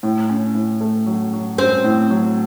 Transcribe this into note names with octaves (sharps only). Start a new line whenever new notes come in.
A2
C#4
A2
A3
F#3
F#3
C4 C#4
A2
F#3